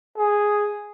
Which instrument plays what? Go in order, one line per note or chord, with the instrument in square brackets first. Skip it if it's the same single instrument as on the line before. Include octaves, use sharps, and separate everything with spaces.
[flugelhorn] G#4